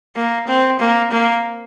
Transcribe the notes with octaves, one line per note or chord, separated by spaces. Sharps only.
A#3
C4
A#3
A#3